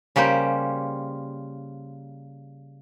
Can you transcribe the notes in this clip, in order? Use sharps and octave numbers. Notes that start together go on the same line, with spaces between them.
C#3 G3 A#3 G4 C5